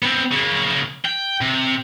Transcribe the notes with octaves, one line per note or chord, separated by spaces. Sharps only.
B3 C4
C#3 A#3
G5
C3